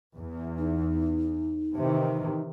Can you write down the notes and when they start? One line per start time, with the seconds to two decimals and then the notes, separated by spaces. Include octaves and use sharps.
0.18 E2
0.58 D#4
1.77 C3 D#3 E3